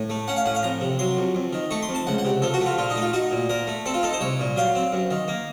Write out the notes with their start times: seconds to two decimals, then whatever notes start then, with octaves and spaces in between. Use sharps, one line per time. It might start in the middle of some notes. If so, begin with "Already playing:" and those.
Already playing: A2
0.10 A3
0.28 C#4 F#5
0.36 F5
0.46 A2 F#5
0.55 F5
0.63 F2 A#5
0.81 C3
0.99 F#3 C6
1.17 F2
1.35 F2
1.53 D#3
1.71 A3 C#6
1.82 C6
1.89 F2
1.95 A5
2.07 C#2 F#5
2.18 F#5
2.25 C3
2.42 F3 A4
2.54 F#4
2.60 A3
2.66 F4
2.77 A#2 F4
2.90 D#4
2.96 A3
3.02 F4
3.13 D#4 F#4
3.31 A#2
3.49 A#2 A#4
3.67 A3
3.86 C4 A4
3.94 F4
4.03 D#4 A4
4.13 C5
4.21 C2 C#5
4.40 A#2
4.56 F#3 F5
4.75 C4
4.92 F#2
5.11 D#3
5.28 A#3